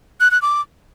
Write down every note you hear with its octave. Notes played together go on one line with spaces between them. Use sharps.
F#6
F#6
D6